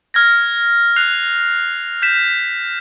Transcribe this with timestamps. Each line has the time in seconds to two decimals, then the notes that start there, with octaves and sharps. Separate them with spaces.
0.14 F6 G#6 A#6
0.96 F#6 C7 F7
2.02 G6 B6 E7